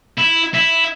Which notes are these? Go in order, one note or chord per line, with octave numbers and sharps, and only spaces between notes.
E4
E4